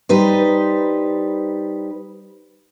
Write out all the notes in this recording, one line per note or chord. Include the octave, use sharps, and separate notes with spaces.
G3 D#4 B4 C5